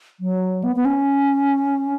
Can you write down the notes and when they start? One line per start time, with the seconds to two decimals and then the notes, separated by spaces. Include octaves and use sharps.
0.20 F#3
0.64 B3
0.76 B3
0.85 C#4